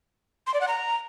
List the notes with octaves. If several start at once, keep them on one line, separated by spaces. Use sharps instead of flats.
C6
D5
F#5
A#5